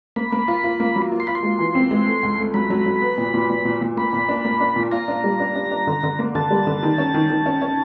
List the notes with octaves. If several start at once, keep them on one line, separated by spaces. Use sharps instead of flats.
A#3 B5
A#3
F4
F4
A#3
F#3
F4
C6
F4 B5
C6
G#3
E3
C4
G#3
A3
C#2
A3
F#3 B5
F#3
F#3
B3
A#2
A#2
A#2
A#2
A#2
A#3 B5
A#2
D4
A#3
D4
A#2
F4 A#5
D4
G3
D4
D4
D4
D3
D3
A#3
D3 A5
G3
D3
D#3
C#4
D#3
D#3
C#4
C#4